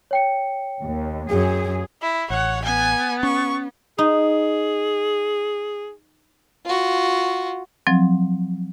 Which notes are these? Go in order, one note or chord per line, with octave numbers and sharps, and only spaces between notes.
C#5 G5 C#7
D#2
F#2 G#4
E4
A1 C#5 F#5
B3 G#5
C#4 C#6
D#4 G#4
F4 F#4
F3 F#3 C4